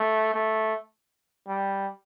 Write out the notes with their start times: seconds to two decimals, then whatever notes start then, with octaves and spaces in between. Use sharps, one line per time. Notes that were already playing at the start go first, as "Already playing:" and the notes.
Already playing: A3
0.34 A3
1.48 G3